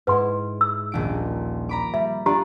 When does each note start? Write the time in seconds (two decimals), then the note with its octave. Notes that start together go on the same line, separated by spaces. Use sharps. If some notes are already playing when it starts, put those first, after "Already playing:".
0.07 G#2 E4 B4 F#5 C6
0.61 E6
0.92 D#1 A#1 D7
1.69 A#5 B5 D6
1.94 G3 E5
2.26 D4 F4 G4 D5 A#5